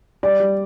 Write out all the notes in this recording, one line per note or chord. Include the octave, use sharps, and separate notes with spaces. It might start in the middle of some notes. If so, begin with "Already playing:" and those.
G3 D5
G3